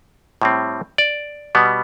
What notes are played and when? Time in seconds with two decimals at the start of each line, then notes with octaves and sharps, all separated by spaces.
0.42 A2 G3 C4
0.98 D5
1.55 B2 G3 B3